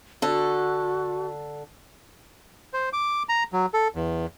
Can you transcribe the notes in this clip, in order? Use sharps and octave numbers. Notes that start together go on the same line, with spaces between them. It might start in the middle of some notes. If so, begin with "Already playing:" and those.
D3 F#4 A4
C5
D6
A#5
F#3
A4
E2